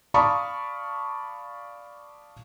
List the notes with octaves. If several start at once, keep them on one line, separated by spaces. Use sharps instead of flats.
D5 F5 A5 B5 C#6 D#6